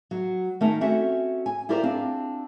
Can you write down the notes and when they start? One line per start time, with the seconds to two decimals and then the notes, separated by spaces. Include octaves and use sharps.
0.11 F#3
0.61 D#3 A3 C#4 D#4 A#4 A5
0.81 C4 C#4 F#4 A4 E5
1.46 G#5
1.69 E4 F4 G4 A#4 C5 D5
1.83 C4 D4 F4 G#4